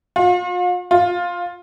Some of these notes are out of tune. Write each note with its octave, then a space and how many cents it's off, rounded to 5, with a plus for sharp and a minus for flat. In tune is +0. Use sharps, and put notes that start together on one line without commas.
F4 +45
F4 +10